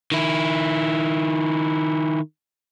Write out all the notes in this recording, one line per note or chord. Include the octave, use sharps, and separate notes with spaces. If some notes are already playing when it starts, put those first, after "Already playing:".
D#3 E4